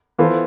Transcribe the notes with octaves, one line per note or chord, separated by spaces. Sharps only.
E3 B3 F4 A4 C5